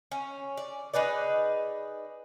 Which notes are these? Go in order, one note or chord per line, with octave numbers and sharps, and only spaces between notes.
C#4
D5
D#4 G#4 B4 D5